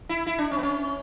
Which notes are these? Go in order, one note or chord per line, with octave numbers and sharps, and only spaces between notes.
E4
E4
D4
C#4
B3
C#4